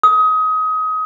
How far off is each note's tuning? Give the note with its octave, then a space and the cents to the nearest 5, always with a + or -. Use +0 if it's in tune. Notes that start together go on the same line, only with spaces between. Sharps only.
D#6 +25